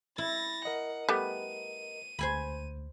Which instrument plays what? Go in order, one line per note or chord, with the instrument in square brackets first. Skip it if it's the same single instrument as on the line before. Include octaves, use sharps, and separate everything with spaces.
[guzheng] E4 [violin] A6 A#6
[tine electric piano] A#4 D#5 [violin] F#5
[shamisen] G3 A3 B3 [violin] D#7
[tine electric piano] D2 [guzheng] C5 G#5 B5